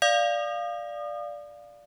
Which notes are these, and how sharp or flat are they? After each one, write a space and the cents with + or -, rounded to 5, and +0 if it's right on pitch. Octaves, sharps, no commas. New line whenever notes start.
D5 +0 F5 +0 D#6 -35